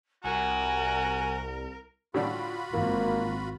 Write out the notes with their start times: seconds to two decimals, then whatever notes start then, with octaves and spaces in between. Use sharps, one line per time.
0.24 C2 F#4 A#4 G#5
2.14 A2 D3 G3 F4 F#4 B5
2.73 G#1 E3 A#3